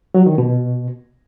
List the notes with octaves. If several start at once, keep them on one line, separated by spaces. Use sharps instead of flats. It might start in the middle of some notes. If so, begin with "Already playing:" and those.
F#3
D#3
B2